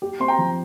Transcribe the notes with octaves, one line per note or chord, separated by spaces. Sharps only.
G4
C4 C6
G5 A#5
F3